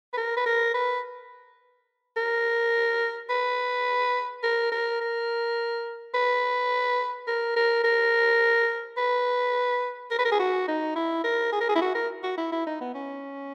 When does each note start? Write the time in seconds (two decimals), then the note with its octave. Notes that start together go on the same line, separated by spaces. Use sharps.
0.13 B4
0.17 A#4
0.37 B4
0.46 A#4
0.74 B4
2.17 A#4
3.30 B4
4.43 A#4
4.72 A#4
5.01 A#4
6.14 B4
7.27 A#4
7.56 A#4
7.84 A#4
8.97 B4
10.11 A#4
10.19 B4
10.25 A#4
10.32 G#4
10.40 F#4
10.68 D#4
10.95 E4
11.24 A#4
11.52 G#4
11.61 A#4
11.69 G#4
11.76 E4
11.81 F#4
11.95 A#4
12.23 F#4
12.38 E4
12.52 E4
12.66 D#4
12.81 B3
12.95 C#4